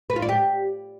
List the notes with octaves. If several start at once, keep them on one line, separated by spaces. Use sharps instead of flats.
B4
F4
D5
G4